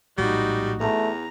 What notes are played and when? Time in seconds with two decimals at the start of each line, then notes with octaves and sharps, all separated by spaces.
0.18 A#1 A2 G3 G#3 D#4 F#4
0.81 E2 A3 A#5